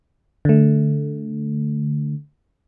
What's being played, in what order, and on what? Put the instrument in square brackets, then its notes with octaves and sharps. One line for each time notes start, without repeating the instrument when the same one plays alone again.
[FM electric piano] D3 A3